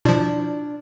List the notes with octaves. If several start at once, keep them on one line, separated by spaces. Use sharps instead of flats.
B2 F3 D4 E4 F4 D5